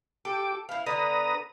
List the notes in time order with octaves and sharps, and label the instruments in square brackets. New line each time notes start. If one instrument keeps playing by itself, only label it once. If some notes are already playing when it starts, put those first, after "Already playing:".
[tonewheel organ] G4 D6 [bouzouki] A4
[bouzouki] B3 E4 [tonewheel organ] F5
[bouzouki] D3 B3 [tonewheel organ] B4 A#5 D#6